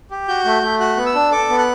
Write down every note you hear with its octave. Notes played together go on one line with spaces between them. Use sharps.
G4
F#4 G6
A3
A3
F#4 F#6
B3
E6
D4
A4 D6
B3
F#6